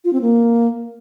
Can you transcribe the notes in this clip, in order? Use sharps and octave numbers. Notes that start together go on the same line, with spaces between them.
F4
C4
A#3